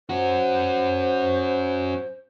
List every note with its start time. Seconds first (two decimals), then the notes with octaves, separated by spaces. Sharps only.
0.09 C#4 F#4 C5